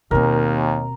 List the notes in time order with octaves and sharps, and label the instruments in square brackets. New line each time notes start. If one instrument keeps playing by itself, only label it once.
[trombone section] D#2 [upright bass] B2 C4 [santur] A#4